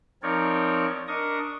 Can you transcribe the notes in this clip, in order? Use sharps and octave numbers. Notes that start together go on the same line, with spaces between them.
F3 C4 D#4 A#4 C#5 D5
D4 A#4 D#5 C#6 D#6